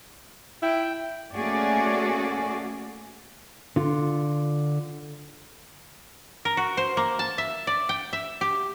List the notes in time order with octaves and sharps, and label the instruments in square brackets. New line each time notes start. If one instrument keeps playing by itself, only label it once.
[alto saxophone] E4 [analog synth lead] G5
[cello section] A3 A#3 C#4 F#4 G#4 D5
[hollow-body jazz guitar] D3 F4
[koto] A#4
F#4
C5
A#3
A5
E5
D5
G5
E5
G4